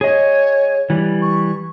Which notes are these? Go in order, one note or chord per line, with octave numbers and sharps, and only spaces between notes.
G#4 C#5 D#5
E3 G3
C#6